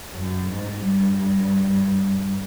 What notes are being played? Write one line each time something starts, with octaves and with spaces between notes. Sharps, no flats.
F#2
G#2
G2